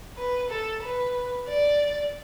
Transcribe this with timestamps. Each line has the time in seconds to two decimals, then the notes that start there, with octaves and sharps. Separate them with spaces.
0.17 B4
0.50 A4
0.83 B4
1.48 D5